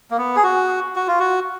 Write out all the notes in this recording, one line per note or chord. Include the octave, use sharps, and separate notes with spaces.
A#3
B3
G#4
F#4
F#4
F4
F#4